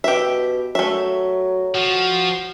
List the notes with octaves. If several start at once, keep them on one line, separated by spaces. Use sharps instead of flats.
B2 G4 E5
F#3 A3 E5
F3 F#4